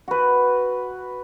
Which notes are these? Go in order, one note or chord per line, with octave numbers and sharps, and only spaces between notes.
F#4 B4